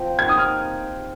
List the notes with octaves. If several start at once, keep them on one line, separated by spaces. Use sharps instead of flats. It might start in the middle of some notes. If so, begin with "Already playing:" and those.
Already playing: F3 C4
A#3 D#4 G4 G#6
D#6
F6